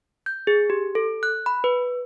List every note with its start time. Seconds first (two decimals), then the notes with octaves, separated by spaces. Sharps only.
0.26 G6
0.47 G#4
0.70 G4
0.95 A4
1.23 F#6
1.46 B5
1.64 B4